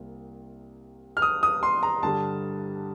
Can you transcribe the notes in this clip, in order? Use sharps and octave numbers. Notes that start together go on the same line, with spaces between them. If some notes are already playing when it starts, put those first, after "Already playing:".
Already playing: C2 C3 A#3
F6
D#6
D#6
C6
A#5
G2 D3 G3 A5